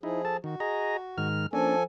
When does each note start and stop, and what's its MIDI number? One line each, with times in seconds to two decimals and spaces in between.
0.03 0.37 53
0.03 0.22 63
0.03 0.22 64
0.03 0.37 68
0.25 0.37 69
0.25 0.37 81
0.44 0.56 51
0.44 1.28 66
0.60 0.97 68
0.60 0.97 75
0.60 0.97 82
1.18 1.47 44
1.18 1.47 51
1.18 1.47 89
1.53 1.83 53
1.53 1.76 58
1.53 1.76 61
1.53 1.76 62
1.53 1.83 69
1.53 1.83 80